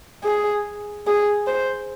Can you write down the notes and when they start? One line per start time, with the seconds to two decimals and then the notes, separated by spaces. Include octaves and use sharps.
0.24 G#4
1.07 G#4
1.47 C5